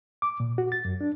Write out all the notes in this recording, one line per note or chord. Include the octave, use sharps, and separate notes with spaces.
D6
A#2
F#4
A6
F#2
D4